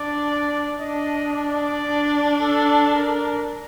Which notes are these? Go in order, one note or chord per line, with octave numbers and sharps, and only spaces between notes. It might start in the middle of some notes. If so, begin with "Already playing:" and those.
Already playing: D4 D5
D4 D#5
D5
D4
A4
A#4